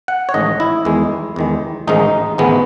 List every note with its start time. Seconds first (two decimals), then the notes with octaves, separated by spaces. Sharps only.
0.08 F#5
0.29 C#5
0.34 A1 G#2 D#3 D#5
0.60 E4
0.85 E2 D#3 G#3
1.36 E2 D#3 G#3
1.87 A1 G#2 D#3 G#3 D#4
2.38 A1 G#2 D#3 G#3 B3